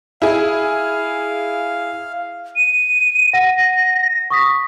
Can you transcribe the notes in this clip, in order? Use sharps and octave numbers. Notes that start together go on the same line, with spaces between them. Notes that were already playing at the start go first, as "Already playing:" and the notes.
E4 G#4 F5
D#7
F#5 A#6
C#6 D#6 B6